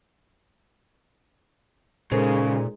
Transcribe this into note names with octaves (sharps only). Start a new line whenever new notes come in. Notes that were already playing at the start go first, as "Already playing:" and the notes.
A#2 C#3 G#3 D#4 A4 A#4 C5